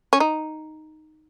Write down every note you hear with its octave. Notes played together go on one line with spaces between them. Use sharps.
C#4
D#4